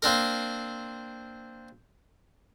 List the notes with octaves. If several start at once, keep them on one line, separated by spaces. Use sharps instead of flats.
A#3 C4 D4 A#4